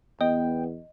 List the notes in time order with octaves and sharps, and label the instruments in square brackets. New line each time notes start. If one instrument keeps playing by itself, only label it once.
[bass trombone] E2 [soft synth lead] B3 [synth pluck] D#5 [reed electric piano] G5